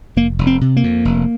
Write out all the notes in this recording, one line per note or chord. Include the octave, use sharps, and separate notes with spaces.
F1 A#3
F1
C4
C3
A#3
F2
F1